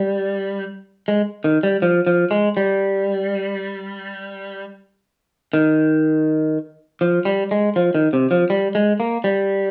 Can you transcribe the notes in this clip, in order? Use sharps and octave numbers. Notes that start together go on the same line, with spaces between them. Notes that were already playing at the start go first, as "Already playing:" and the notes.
Already playing: G3
G#3
D#3
G3
F3
F3
G#3
G3
D#3
F3
G3
G#3
F3
D#3
C3
F3
G3
G#3
A#3
G3